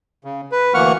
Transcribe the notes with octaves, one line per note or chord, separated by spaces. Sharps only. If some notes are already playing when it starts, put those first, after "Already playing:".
C#3
B4
D2 E3 A#3 F#5 C#6 F6